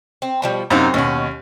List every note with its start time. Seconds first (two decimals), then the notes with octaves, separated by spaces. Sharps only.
0.22 C4
0.42 B2 F3 G3
0.70 F#2 C3 C4 D#4 C5 F5
0.94 D#2 B2 C#4 F#5